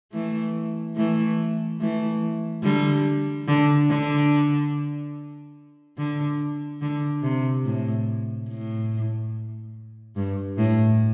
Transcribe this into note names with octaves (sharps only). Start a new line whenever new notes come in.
E3 A3
E3 A3
E3 A3
D3 G3
D3
D3
D3
D3
C3
A2
A2
G2
A2